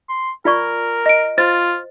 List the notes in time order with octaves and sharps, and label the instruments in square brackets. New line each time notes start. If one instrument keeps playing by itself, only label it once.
[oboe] C6
[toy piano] F4 D5 C#6 [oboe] A#4
[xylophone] D#5 D7
[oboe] F4 [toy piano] C5 [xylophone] A6